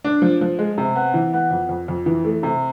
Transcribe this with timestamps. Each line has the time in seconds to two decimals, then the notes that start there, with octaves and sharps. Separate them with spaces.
0.05 D4
0.22 F3
0.41 F3
0.59 G#3
0.78 C3
0.95 B3
1.14 E3
1.33 B3
1.51 F2
1.69 F2
1.88 F2
2.06 E3
2.24 A3
2.43 C3